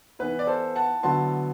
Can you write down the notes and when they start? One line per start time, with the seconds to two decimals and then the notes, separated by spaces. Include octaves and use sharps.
0.19 E3 B3 E4 B4
0.39 D5
0.47 A4 C5
0.76 F#5 A5
1.03 D3 F#3 B3 E4 A5 C6